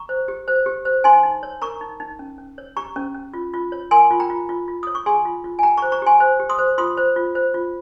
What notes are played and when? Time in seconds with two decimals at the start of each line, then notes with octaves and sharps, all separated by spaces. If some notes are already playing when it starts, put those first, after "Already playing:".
Already playing: A#5 C#6
0.09 C5
0.28 G4
0.48 C5
0.66 G4
0.85 C5
1.04 D#4 G#5 C6
1.23 D#4
1.43 C#5
1.62 A#4 A#5 C#6
1.81 D#4
2.00 D#4
2.19 C#4
2.38 C#4
2.58 C#5
2.77 G4 A#5 C#6
2.96 C#4
3.15 C#4
3.34 F4
3.54 F4
3.72 C#5
3.91 A#4 G#5 C6
4.11 F4
4.20 G5 A#5
4.30 F4
4.49 F4
4.68 F4
4.83 C#5 D#6
4.95 C#6
5.06 G#4 G#5 C6
5.25 F4
5.44 F4
5.59 G#5
5.63 G4 G5 A#5
5.77 C5 A#5 C#6
5.92 A#5 C#6
6.02 G4 G#5 C6
6.20 C5
6.40 G4
6.49 C6 D#6
6.59 C5
6.78 F4 C6 D#6
6.97 C5
7.16 F4
7.35 C5
7.54 F4